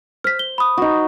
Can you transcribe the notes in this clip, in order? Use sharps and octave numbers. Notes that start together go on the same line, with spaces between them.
C5 F6 B6
G7
B5 D#6
D#4 F#4